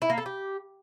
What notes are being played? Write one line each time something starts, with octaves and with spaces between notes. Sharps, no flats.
E4
A#3
A4
G4